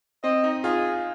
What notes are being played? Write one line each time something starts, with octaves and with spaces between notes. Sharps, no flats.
C4 D#5
D#4
F4 G#4